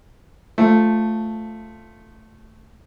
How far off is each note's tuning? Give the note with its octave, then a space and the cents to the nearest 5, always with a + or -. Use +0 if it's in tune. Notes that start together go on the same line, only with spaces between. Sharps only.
F3 +0 A3 +0